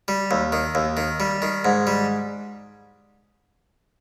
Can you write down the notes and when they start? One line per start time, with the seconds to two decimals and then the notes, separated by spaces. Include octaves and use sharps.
0.08 G3
0.31 D#2
0.52 D#3
0.75 D#2
0.97 D#3
1.20 G3
1.42 D#3
1.65 G#2
1.87 G3